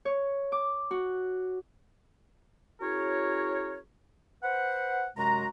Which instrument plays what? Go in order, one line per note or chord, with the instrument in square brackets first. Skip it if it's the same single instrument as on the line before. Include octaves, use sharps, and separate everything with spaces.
[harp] C#5
D6
F#4
[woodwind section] C#4 E4 F#4 G#4 A#4 C#5
B4 C5 F#5
F#2 C3 G#3 F#4 A#5